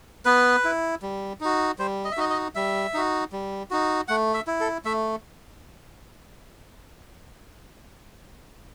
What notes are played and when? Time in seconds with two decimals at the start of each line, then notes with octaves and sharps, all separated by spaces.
0.25 B3 B4
0.64 E4
1.02 G3
1.41 D#4 F#4
1.79 G3 C5
2.05 D#5
2.12 E5
2.17 D#4 F#4 D#5
2.30 D#5
2.55 G3 E5
2.94 D#4 F#4
3.32 G3
3.71 D#4 F#4
4.08 A3 F#5
4.34 E5
4.47 E4
4.61 A4
4.85 A3 E5